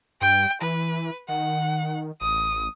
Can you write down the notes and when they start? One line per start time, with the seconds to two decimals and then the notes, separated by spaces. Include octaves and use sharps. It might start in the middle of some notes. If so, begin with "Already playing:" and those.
0.21 G2 G5
0.61 E3 B4
1.29 D#3 F#5
2.21 A1 D#6